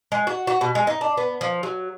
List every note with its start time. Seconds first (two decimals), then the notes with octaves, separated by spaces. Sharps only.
0.12 G#3
0.27 F#4
0.47 F#4
0.61 B2
0.75 G#3
0.87 D#4
1.01 D4
1.17 B3
1.41 F3
1.63 F#3